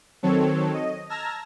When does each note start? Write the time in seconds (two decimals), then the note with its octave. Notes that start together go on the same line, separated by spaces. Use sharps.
0.23 D#3 F#3 C4 A4 C#5
0.74 D#5
1.09 A5 A#5 E6 F6 G#6 A#6